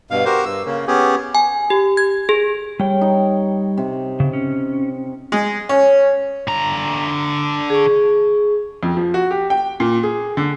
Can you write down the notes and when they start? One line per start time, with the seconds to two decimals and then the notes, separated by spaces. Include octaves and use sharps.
0.11 G2 B2 F5
0.25 F#4 G4 A#4 C5
0.45 G2 E6
0.66 C#3 A#3 C#4
0.87 B3 C#4 G4 G#4
1.35 G#5
1.70 G4
1.97 G#6
2.29 G#4
2.80 G3 C#5 G5
3.01 D#4
3.77 C3
4.20 C#3
4.33 C#4
5.32 G#3
5.69 C#4
6.48 D3 A#5
7.70 G#4 C#6
8.83 F2
8.97 F3
9.14 F#4
9.31 G4
9.50 G5
9.80 A#2
10.03 G#4
10.37 D3